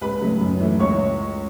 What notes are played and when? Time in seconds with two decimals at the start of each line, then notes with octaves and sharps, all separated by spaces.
0.01 C#2 B4 B5
0.21 C#3 F#3 A3
0.41 F#2
0.60 E3 A3
0.80 C#2 C#5 C#6